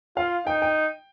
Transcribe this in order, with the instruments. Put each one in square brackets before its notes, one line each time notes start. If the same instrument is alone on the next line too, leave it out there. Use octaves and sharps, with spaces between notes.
[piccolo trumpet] F4 [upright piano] F5
[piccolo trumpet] D#4 [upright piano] G5
[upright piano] G5